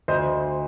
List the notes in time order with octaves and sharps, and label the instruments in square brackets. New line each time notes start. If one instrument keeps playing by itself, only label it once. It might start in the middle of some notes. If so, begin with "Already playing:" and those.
[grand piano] D2 C5 D#5